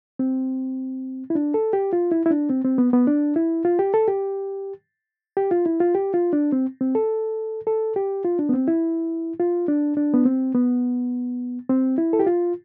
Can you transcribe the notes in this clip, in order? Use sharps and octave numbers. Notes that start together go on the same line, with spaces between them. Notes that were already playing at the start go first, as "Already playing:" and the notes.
C4
E4
D4
A4
G4
F4
E4
E4
D4
C4
C4
B3
B3
D4
E4
F4
G4
A4
G4
G4
F4
E4
F4
G4
F4
D4
C4
C4
A4
A4
G4
F4
D4
B3
C4
E4
F4
D4
D4
B3
C4
B3
C4
E4
A4
G4
F4